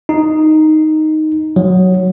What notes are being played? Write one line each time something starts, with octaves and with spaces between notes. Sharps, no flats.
D#4
F#3